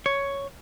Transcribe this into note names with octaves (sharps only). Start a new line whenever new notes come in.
C#5